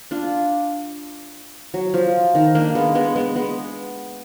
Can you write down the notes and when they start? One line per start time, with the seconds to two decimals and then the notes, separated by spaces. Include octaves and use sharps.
0.11 D4 F4
1.74 F#3
1.94 F3
2.35 D#3
2.55 A#3 D4
2.75 G#3 B3
2.95 G#3 B3
3.16 G#3 B3
3.36 G#3 B3